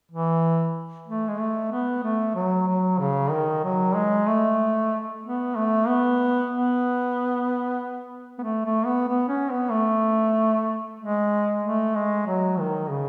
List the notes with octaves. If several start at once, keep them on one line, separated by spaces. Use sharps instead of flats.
E3
A3
G#3
A3
B3
A3
F#3
F#3
C#3
D#3
F#3
G#3
A3
B3
A3
B3
B3
B3
A3
A3
B3
B3
C#4
B3
A3
G#3
A3
G#3
F#3
D#3
C#3